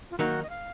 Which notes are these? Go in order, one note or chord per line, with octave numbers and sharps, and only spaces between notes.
F4
D#3 F#3 A#3 D#4 F#4
D#5
F5